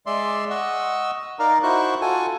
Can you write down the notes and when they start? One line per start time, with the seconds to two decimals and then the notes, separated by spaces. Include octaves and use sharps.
0.06 G#3 D5 E5 C6
0.50 D#5 F#5 C#6 E6
1.39 D#4 A#4 D5 F5 A#5
1.63 D#4 E4 F#4 C5 C#6 F#6
2.01 F4 F#4 A4 G#5 C#6